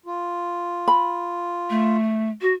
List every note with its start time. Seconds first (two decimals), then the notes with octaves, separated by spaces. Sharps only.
0.06 F4
0.88 B5
1.70 A3
2.41 F#4